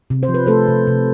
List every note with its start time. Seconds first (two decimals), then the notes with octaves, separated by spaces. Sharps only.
0.10 C3
0.23 C5
0.28 F3
0.34 B4
0.46 A3 A4 C5
0.68 C3
0.87 C3